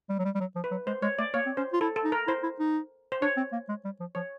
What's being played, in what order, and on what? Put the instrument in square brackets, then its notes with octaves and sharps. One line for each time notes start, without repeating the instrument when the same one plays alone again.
[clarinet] G3
F#3
G3
G3
F#3
F3
[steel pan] B4
[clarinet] F#3
[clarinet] G#3 [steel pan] C5
[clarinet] G#3 [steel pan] C#5
[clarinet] A3 [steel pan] D5
[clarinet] A#3 [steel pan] C#5
[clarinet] C4
[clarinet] C#4 [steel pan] C5
[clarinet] F4
[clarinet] E4 [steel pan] A4
[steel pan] A4
[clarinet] D#4
[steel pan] A#4
[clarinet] E4 [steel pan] C5
[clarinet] E4
D#4
[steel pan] C5
[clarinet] D4 [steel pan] C#5
[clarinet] C4
A#3
G#3
G3
F3
[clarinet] F3 [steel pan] C#5